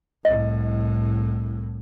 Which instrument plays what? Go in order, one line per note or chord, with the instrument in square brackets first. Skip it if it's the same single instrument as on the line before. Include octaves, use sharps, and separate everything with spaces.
[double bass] C2 A2 [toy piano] D#5